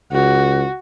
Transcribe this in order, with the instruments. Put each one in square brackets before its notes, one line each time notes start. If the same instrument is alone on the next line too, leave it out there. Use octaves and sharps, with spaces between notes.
[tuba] C#2 [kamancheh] F#4